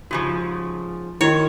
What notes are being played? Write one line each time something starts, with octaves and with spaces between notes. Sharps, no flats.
G#2 C#3 F3 F#4 G4
D#3 E4 F#4 C#5